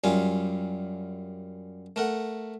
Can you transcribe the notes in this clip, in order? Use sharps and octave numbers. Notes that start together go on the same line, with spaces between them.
F#2 G3 F4 G#5
A3 A#4 F#5